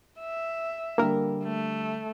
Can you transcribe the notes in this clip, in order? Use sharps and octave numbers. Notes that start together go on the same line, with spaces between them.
E5
D3 G3 A#3 A#4
A3